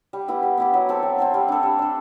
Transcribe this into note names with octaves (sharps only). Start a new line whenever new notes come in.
G3
B3 E4 G4
G3
B3 E4 G4
F#3
C4 E4 A4
F#3
C4 E4 A4
G3
D4 A4
G3
D4 A4